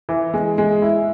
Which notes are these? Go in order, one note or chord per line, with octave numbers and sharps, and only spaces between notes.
E3
G#3
G#3
E4